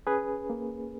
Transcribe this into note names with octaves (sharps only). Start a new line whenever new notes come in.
C#4 G#4 B4
A#3